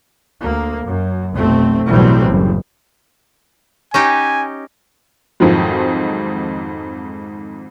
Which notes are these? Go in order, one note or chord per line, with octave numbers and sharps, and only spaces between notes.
D2 A#3
F#2
F1 B1 A3 C4
B1 A2 E3 F#3 G3 C4
F#1
C#4 D#4 G4 G#5
F2 G#2 D#3 F3 F#3 G#3